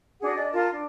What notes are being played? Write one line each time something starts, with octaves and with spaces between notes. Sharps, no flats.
D4 F#4 G#4 F#5
D4 D5 D#5
F4 A#4 A5
D4